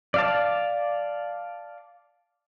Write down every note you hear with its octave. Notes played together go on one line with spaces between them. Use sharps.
D5 F5 A5